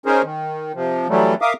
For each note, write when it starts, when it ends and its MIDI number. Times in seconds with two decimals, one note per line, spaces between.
0.06 0.22 61
0.06 0.22 63
0.06 0.22 68
0.06 0.22 70
0.06 0.22 72
0.23 0.72 51
0.75 1.07 48
0.75 1.07 53
1.09 1.35 52
1.09 1.35 54
1.09 1.35 55
1.09 1.35 57
1.41 1.53 70
1.41 1.53 76
1.41 1.53 77
1.41 1.53 86
1.41 1.53 87